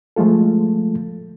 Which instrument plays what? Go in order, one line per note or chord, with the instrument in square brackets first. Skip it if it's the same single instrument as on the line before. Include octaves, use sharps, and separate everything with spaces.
[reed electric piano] F3 G#3 A3 F4 A4